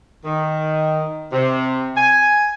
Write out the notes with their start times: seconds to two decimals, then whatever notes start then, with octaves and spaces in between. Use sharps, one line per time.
0.25 D#3
1.32 C3
1.96 G#5